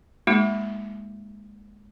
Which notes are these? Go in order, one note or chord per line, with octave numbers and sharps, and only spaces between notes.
G#3 A#3 D#4 F#4